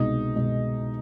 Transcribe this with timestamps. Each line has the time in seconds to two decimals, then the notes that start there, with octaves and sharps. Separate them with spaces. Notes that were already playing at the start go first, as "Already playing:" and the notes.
Already playing: C2 B2 G#3 D#4
0.36 B2 G#3